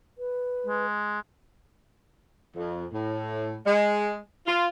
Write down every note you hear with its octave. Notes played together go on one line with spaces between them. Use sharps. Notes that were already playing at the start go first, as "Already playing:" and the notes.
B4
G#3
F2
A2
G#3
F4